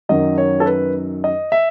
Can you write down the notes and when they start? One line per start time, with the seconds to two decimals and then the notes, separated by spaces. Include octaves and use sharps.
0.09 F#2 D#3 F#3 D#5
0.38 C#5
0.60 A4
0.66 B4
1.24 D#5
1.52 E5